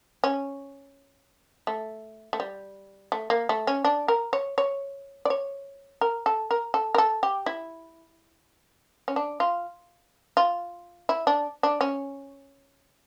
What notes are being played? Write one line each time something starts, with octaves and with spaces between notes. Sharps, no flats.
C#4
A3
A3
G3
A3
A#3
A3
C#4
D4
A#4
C#5
C#5
D5
C#5
A#4
A4
A#4
A4
A#4
A4
G4
E4
C#4
D4
F4
F4
E4
D4
D4
C#4